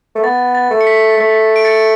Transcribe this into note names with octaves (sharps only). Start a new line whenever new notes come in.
A3
B3 A6
A6
A3
C#7
B6
A3 B6
D7
A6 C#7